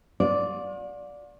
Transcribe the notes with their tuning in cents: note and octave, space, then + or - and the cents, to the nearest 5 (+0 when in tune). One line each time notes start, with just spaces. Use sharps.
F4 +45 D5 -10